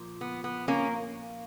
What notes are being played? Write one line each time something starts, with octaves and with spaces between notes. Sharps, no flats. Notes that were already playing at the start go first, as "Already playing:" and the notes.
Already playing: A#2 F3
B3
B3
A#3 C#4